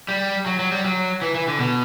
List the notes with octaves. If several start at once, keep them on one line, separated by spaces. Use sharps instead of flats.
G3
F#3
F#3
G3
F#3
E3
E3
D3
B2